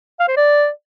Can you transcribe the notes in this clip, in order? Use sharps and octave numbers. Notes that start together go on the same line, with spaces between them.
F5
C5
D5